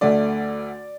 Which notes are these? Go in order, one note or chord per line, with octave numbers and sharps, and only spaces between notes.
D2 D3 A3 D5